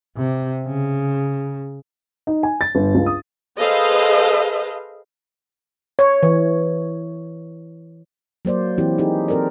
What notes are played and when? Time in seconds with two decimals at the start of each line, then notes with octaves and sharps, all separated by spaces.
0.17 C3
0.67 C#3
2.27 D#4
2.43 G#5
2.61 A6
2.75 G1
2.95 C#2
3.06 D#6
3.59 G#4 A4 B4 C5 D#5 F5
5.99 C#5
6.23 E3
8.45 F#3 A#3 C5 D5
8.78 E3 C4 E4 G4
8.98 D#4 G4 G#4
9.28 C4 A4 A#4 C5 D5